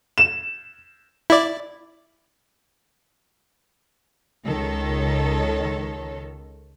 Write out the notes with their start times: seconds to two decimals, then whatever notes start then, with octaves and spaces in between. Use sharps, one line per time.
0.18 E7
1.30 E4 D5
4.44 C#2 D#3 A4 C#5